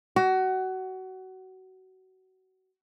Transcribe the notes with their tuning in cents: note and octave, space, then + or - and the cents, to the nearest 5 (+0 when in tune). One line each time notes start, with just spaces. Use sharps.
F#4 +25